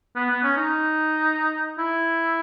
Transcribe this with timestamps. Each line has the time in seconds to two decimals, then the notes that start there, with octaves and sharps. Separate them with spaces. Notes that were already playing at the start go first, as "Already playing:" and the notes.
0.16 B3
0.30 B3
0.43 C#4
0.57 D#4
1.79 E4